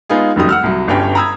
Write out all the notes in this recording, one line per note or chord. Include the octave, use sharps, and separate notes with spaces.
G#3 B3 D#4 F4 G#4
F1 F#2 D#3 G3 D#6
F#5 E6 F6
C2 F#3
G1 G2 C#4 G4 G5
A#5 B5 D#6 E6 G#6